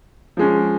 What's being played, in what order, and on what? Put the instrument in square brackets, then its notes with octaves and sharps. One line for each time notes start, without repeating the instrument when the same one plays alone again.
[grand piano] F3 G#3 C#4